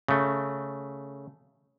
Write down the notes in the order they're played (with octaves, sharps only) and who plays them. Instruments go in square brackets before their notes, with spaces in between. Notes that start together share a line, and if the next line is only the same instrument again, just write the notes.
[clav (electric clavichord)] C#3 A3